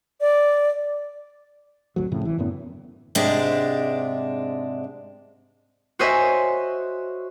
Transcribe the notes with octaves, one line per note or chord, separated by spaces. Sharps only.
D5
G#1 D2 F#3
F2 A2 C#3 F3
G#1 E3
F#2 A2 D3 B3
G#2 C3 G#3 D4
F#4 C5 C#5 D#5 E5 G#5